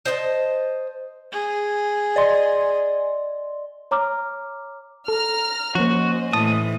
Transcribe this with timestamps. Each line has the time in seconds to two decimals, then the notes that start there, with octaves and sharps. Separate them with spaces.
0.06 C5 D#5 F#5 A5
1.32 G#4
2.16 D5 D#5 C6
3.91 C#5 A#5 D6 F6
5.08 A4 A#5 F6
5.75 F3 A#3 C#4 F#4 C5 D#5
6.33 A2 E3 A5 D#6